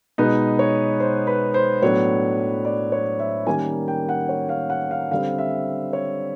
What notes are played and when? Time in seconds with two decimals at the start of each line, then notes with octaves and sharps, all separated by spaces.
0.18 B2 G#3 B3 D#4
0.59 C#5
1.00 C5
1.27 B4
1.54 C5
1.82 A2 F#3 B3 D4 C#5
2.65 D5
2.92 C#5
3.19 E5
3.47 D#3 G3 A#3 C#4 G#5
3.88 G5
4.09 F#5
4.29 C#5
4.49 F5
4.70 F#5
4.91 F5
5.11 D3 G3 C4 F5
5.38 E5
5.93 C#5